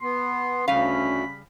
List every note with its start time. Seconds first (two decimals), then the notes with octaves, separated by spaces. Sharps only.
0.01 B3 C6
0.68 D2 C#3 G3 C#4 F5 B5